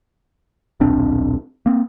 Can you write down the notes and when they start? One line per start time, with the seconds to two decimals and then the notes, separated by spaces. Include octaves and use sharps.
0.80 D#1 B1 C4 D4
1.66 A#3 C4